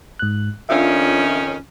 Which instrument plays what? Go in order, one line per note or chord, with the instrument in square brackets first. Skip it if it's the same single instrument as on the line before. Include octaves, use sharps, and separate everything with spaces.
[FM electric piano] G#2 F#6
[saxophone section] F2 D#3 C#4 [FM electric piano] D4 F4 E5